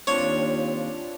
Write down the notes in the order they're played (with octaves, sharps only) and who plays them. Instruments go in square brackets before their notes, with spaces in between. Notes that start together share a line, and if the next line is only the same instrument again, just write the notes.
[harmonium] D#2 [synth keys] C4 D4 F4 [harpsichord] C#5